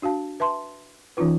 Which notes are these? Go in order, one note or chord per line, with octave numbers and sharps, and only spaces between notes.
D4 F#4 F5 A5
B4 E5 A5 C6
E3 C#4 D#4 F4 B4